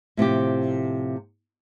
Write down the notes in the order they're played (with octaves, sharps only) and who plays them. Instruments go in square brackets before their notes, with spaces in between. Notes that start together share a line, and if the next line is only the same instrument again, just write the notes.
[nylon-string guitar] A2 C3 F3 G4